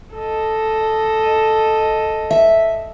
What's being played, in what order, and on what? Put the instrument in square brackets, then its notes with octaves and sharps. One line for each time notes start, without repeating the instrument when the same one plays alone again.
[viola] A4 D#5
[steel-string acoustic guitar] E5